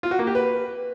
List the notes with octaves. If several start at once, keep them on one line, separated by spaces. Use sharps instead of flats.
F4
F#4
A#3
G4
B4